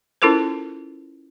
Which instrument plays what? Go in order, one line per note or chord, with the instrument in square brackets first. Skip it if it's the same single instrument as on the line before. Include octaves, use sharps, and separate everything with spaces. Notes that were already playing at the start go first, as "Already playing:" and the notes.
[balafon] C#4 E4 F4 A4 A#4 C5